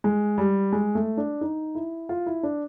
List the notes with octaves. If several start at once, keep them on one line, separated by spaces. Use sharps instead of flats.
G#3
G3
G#3
A3
D4
D#4
E4
F4
E4
D4